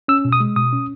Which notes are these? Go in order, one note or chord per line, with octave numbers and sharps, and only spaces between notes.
C#4 E6
B2
D#6
G#3
B2 D#6
C#4